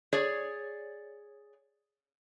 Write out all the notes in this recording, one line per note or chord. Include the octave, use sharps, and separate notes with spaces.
G#4 C#5 D5